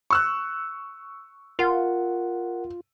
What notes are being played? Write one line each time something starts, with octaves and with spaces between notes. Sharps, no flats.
C#6 E6 F#6
F4 A#4 F#5